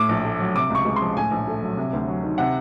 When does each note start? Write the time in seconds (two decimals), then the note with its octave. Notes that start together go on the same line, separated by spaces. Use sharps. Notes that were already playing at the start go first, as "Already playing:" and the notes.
Already playing: A2 D6
0.09 A#1
0.24 A3
0.39 F#3
0.55 C3 D6
0.70 C#2 C#6
0.85 G#3
0.96 C6
1.02 F3
1.16 A2 G#5
1.31 A#1
1.47 A3
1.63 F#3
1.77 C3
1.93 D2
2.07 F#3
2.23 D#3
2.38 C3 F#5